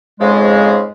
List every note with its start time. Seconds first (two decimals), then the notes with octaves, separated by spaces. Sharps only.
0.20 F2 G#2 C#3 G#3